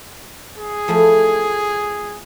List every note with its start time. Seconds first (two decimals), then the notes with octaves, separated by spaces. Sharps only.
0.58 G#4
0.88 F3 A3 E4